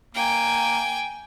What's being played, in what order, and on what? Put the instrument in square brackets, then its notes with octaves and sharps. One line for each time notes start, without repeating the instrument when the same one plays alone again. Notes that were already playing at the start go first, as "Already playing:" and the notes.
[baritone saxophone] A#3 [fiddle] G5 G#5